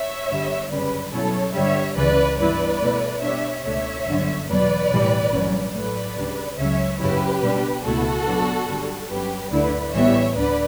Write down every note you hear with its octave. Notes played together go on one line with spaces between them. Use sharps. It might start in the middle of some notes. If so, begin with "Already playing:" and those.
Already playing: C#5 E5
G1 G2 D3 G3
G1 F#2 C#3 G3 C#4 B4 D5
B2 F#3 C#4 E4 A4 C#5
G2 D3 G3 C#5 E5
C#2 C#3 E3 B4 D5
G2 E3 B3 E4 B4 D5
B2 A3 E4
B2 G3 D4 C#5 E5
C#2 B2 A3 D4 C#5 E5
G1 F#2 D3
E2 B2 F#3 B4 D5
B1 A2 E3 G3
A1 G2 F#3 C#4
A2 F#3 A3 B4 D5
D2 C#3 G3 D4
C#2 C#3 F#3 C#4 C#5 E5
F#2 C#3 F#3 C#4 E4 G4 B4
B2 G3 D4
C#2 B2 A3 E4 F#4 A4
B2 F#3 B3 D4
G1 F#2 D3 G3
G1 G2 F#3 C#4 G4 B4
D2 D3 A3 E4 B4 D5
A1 A2 E3 G3 B3 C#5 E5
D2 D3 B4 D5